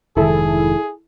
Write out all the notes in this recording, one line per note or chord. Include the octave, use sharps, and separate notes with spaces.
F1 G#2 D#3 E4 G#4 A4